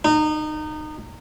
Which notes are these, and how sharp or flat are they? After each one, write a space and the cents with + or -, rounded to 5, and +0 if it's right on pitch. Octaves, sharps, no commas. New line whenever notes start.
D#4 -25